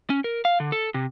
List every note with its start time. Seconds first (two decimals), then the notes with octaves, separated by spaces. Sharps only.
0.10 C#4
0.24 A#4
0.45 F5
0.60 D3
0.72 A4
0.94 C3